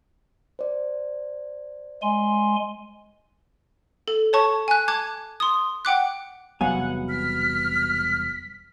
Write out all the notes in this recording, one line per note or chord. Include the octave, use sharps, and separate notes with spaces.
C5 D5
G#3 G#5 C6
A4
C#5 A5 C#6
G#5 F#6
A5 D6 F#6 G#6
C6 D#6
F#5 G5 D6 F#6
E1 C2 F#3 B3 F5 F#5 G#5
F6 B6